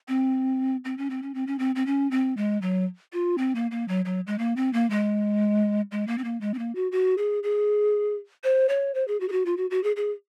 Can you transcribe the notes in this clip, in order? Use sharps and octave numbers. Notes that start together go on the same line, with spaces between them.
C4
C4
C#4
C4
C#4
C4
C#4
C4
C4
C#4
C4
G#3
F#3
F4
C4
A#3
A#3
F#3
F#3
G#3
A#3
C4
A#3
G#3
G#3
A#3
C4
A#3
G#3
C4
A#3
F#4
F#4
G#4
G#4
C5
C#5
C5
G#4
F#4
G#4
F#4
F4
F#4
F#4
G#4
G#4